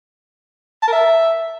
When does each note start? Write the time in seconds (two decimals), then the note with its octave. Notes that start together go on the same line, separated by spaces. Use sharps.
0.82 A5
0.88 A#4
0.93 E5